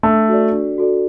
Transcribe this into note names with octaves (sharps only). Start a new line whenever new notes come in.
A3 D4
F#4 A4 D5
D4
F#4 A4 D5